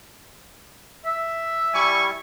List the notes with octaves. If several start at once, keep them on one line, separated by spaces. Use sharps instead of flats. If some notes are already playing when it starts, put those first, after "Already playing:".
E5
G3 E4 D5 G#5 C#6